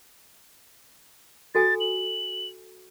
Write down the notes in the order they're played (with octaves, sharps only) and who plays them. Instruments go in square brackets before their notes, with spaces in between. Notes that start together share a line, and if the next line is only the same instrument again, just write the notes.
[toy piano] F#4 A4 G#5 [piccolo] A6
[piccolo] F#7